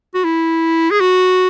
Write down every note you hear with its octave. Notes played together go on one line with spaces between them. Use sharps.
F#4
E4
G#4
F#4